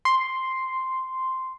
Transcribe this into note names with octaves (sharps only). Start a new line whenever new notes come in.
C6